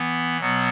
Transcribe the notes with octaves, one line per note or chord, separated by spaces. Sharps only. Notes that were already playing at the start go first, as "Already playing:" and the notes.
Already playing: E3 B3
B2 F#3 B3